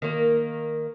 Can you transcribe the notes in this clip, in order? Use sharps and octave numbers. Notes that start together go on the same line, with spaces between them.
D#3 A#3